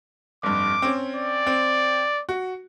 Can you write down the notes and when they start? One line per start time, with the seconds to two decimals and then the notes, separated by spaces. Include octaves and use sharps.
0.43 F1 G2 D6
0.82 C4 C#4
1.16 D5
1.47 C4
2.29 F#4